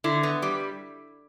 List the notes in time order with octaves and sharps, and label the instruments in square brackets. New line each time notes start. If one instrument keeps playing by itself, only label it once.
[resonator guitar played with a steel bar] D3 E4
B3
G3